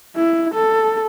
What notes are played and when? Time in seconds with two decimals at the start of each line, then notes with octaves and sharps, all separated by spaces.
0.16 E4
0.55 A4